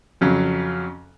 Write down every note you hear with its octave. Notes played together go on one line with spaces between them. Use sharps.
F2 C#3 F#3